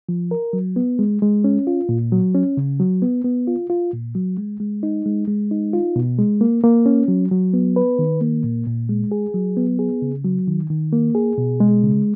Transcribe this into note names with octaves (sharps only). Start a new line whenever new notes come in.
F3
A#4
F#3
B3
G#3
G#3
C#4
F4
A#2
F#3
C#4
C#3
F#3
B3
B3
F4
F4
A#2
F#3
G#3
G#3
D#4
G#3
G#3
D#4
F4
B2
G#3
A#3
A#3
C#4
F#3
F#3
B3
B4
D#3
A#3
A#2
A#2
G#3
G#4
F#3
B3
G#4
C#3
F#3
D#3
D#3
A#3
G#4
B2
G#3
C#3